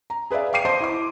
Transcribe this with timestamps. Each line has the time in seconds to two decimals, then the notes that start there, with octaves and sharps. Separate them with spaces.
0.10 A#5
0.30 G#4 B4 D5 E5 F5
0.53 F5 G5 D6 C7 D#7
0.65 C5 D#5 A5 C6 D6
0.80 E4 D6